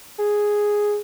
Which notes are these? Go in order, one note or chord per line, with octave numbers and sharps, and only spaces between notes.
G#4